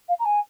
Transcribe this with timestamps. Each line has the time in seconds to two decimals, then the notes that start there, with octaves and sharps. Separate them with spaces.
0.08 F5
0.19 A#5
0.25 G#5